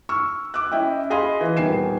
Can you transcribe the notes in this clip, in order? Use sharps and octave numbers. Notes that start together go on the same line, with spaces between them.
C#6 E6 F6
D6 E6 F#6
C#4 E4 D#5 G5
G#4 D#5 F5 G#5 B5 C6
E3
D#1 D#3 B3 G#5 C7 E7